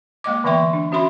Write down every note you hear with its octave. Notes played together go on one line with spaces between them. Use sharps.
G#3 A#3 D#5 D6
D3 E3 B3 E5 G5 C6
D4
C#4 F#4 E5 B5 C6